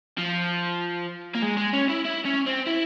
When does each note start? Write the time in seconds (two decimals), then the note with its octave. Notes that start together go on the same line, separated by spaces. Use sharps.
0.18 F3
1.35 A#3
1.43 G#3
1.58 G#3
1.73 C#4
1.89 E4
2.05 E4
2.25 C#4
2.47 C4
2.67 E4